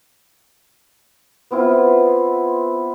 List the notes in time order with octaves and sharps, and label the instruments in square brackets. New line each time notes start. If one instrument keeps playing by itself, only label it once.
[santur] B3 C4 E4 F4